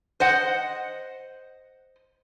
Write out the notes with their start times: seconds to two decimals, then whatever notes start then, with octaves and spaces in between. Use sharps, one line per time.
0.20 C5 D#5 F#5